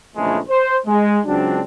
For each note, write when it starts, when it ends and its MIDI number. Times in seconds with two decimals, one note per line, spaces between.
0.17 0.39 34
0.17 0.39 41
0.17 0.39 49
0.17 0.39 52
0.17 0.39 56
0.17 0.39 57
0.49 0.77 72
0.87 1.20 56
1.26 1.62 37
1.26 1.62 54
1.26 1.62 60
1.26 1.62 62